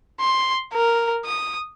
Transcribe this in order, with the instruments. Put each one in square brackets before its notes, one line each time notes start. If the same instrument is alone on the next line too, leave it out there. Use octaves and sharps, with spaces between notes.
[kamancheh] C6
A#4
D#6